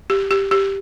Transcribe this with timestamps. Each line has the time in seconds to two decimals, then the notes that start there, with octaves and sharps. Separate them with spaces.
0.10 G4
0.31 G4
0.51 G4